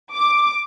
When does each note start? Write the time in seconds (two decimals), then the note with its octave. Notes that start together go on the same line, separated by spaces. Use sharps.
0.13 D6